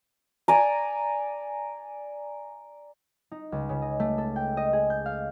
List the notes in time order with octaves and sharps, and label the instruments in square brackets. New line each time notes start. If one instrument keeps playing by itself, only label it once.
[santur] D5 G#5 A#5
[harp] D#4
C#2
C#3
D#5
A3
A4
G5
D#5
G#4
G6
F5